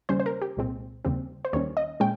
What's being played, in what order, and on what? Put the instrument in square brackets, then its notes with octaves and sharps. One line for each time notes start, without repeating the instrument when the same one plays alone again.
[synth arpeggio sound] D#2 C#3 G3 C#4 C5
C5
A#4
G4
C2 A#2 G#3 C4
D#2 C#3 G3 C4
C5
D#2 D#3 G3 C#4 C#5
D#5
A#2 G#3 C#4 G5